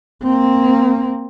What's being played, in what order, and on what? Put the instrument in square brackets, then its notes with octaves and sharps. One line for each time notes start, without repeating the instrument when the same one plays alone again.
[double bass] A#3 C4